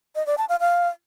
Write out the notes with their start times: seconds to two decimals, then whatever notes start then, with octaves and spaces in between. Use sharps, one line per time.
0.15 D#5
0.27 D5
0.38 A5
0.49 F5
0.60 F5